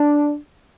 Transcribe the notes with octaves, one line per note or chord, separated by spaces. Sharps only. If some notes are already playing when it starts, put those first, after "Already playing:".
Already playing: D4